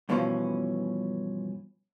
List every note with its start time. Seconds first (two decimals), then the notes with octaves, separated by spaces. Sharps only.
0.09 G2 B2 E3 F3 C#4